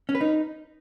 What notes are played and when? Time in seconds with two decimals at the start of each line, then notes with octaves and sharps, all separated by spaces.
0.09 C#4
0.15 B4
0.21 D#4